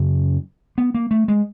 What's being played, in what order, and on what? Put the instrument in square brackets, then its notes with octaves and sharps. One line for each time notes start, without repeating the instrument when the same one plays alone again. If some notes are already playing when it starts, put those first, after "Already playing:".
Already playing: [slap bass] F#2 C#3 C#4
B3
A#3
A3
G#3